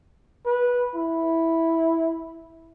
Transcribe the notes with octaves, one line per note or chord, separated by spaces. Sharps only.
B4
E4